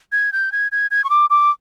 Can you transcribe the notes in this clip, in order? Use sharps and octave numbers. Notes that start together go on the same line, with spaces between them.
G#6
G6
G#6
G#6
G#6
C#6
D6
D6